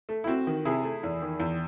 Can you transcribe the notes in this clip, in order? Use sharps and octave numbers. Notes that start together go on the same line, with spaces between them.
A3
E4
C4 F#4
D#3
C3 E4 G#4
A3
E2
D#3
E2